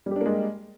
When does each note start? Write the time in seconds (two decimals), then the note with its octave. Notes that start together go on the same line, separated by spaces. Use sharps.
0.06 G3
0.11 G4
0.16 D4
0.21 A#3
0.26 G#3